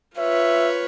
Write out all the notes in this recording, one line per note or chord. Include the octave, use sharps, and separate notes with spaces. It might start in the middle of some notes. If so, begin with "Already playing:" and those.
F4 B4 C#5 E5